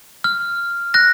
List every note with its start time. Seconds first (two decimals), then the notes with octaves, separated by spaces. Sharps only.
0.24 F6
0.94 F#6 A#6